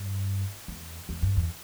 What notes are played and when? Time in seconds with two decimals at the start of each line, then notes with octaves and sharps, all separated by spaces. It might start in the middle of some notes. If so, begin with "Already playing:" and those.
Already playing: G2
0.68 E2
1.09 E2
1.22 G2
1.36 E2